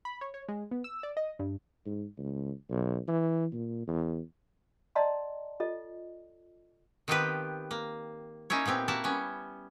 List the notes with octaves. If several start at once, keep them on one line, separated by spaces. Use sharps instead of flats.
B5
C#5
C#5
G#3
B3
E6
D5
D#5
G2
G#2
C#2
B1
E3
A#2
E2
D5 D#5 F#5 A5 A#5 C6
F4 A4 D#5
D#3 B3 C4 F4 G4 B4
A#3
A#3 C#4 D#4 E4 C#5
A#2 B3 C4 G4
A#3 E4 F#4 A5
G3 B3 C#4